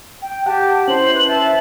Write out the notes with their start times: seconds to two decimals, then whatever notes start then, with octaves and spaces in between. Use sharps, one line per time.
0.22 G5
0.46 G4 F#5 A5
0.88 C#4 E4 C5 F#7
1.15 B4
1.28 E5 A5